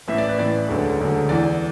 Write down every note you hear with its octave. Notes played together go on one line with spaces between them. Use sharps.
A1 A2 E3 E5
D5
B4
A1 A2 E3 D5
E1 D2 D3 F#3
E1 D2 D3 F#3
E2 E3 D5